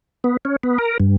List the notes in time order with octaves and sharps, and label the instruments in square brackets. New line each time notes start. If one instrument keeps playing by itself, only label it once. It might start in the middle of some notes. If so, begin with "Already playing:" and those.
[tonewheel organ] B3
C#4
B3
A#4
G2